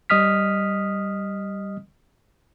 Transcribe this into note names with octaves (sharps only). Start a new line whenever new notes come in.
G3 D#5 D#6 F6 B6